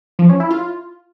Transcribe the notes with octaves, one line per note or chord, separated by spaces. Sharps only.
F3
C#4
E4
F4